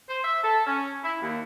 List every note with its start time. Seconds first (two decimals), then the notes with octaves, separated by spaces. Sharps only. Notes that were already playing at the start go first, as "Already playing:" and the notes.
0.08 C5
0.24 E5
0.43 A4
0.67 C#4
1.04 E4
1.21 D#2